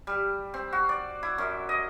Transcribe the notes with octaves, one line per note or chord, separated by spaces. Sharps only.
G3
C4
F#4
D5
E4
F#2
D#5